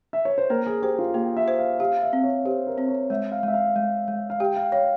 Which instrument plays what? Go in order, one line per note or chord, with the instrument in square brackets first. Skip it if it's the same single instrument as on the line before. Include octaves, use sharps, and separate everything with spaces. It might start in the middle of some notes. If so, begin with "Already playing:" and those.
[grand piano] E5
C#5
C5
[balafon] A#3 [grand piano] A#4
[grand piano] G#4
[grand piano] G4 [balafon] C5
[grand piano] F4
[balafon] A#3 [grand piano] G4
[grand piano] E5
[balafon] C5
[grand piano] F5
[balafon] G4 [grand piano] F5
[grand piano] E5
[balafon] C4
[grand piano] C#5
[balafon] G4 [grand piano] C5
[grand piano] A#4
[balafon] C4
[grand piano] C#5
[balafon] G#3 [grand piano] E5
[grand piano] F5
[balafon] G#3
[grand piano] E5
F5
[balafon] G#3
G#3
[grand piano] F5
[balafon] G4 [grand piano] G5
[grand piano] F5
[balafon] C#5 [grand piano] F5